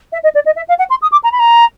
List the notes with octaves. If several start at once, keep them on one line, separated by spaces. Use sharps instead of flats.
E5
D#5
D5
D#5
E5
F5
F#5
C6
D#6
D6
A#5
B5
A#5